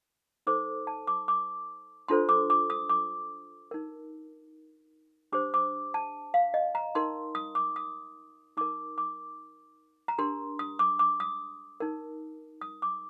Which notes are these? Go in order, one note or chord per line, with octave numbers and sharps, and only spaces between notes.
D#4 A4 C5 D6
A5
D6
D6
D4 F4 A4 C5 C6
D6
D6
D#6
D6
D#4 A#4
D4 G4 C5 D6
D6
A5
F5
D#5
A#5
D#4 A#4 C6
D#6
D6
D#6
D#4 A#4 D6
D6
A#5
D4 G4 A#4 C6
D#6
D6
D6
D#6
D#4 A#4
D#6
D6